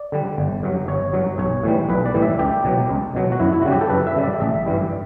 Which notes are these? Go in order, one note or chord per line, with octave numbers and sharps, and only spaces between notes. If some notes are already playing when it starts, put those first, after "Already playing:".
Already playing: D5
D3 G3
G1
G2 F#3
G1 C#5
G2 F#3
B1 C#5
A2 E3 G3
B1 B4
D5
A2 E3 G3
E5
C#2 G4
B2 F#3
C#2
B2 F#3
F#4
F#2 E4
E4
C#3 G3 F#4
G4
A4
F#2 B4
E5
C#3 G3
D5
A1 E5
G2 E3 G3